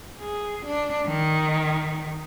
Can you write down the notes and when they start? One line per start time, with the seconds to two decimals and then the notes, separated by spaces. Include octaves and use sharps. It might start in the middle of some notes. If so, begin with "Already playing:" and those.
0.20 G#4
0.67 D4
1.08 D#3